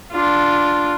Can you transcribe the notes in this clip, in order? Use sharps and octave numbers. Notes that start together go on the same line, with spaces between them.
D4 F4